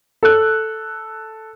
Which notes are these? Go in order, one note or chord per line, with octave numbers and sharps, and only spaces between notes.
A4 F#6